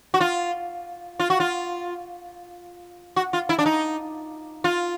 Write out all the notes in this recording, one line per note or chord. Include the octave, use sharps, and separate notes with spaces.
F#4
F4
F4
F#4
F4
F#4
F4
E4
D4
D#4
F4